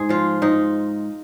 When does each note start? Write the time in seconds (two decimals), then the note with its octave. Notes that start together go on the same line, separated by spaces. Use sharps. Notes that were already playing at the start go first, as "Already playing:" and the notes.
Already playing: G#2 G#4
0.09 F3 F4
0.42 G#2 D#4